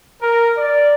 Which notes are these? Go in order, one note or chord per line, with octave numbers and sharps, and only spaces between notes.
A#4
D5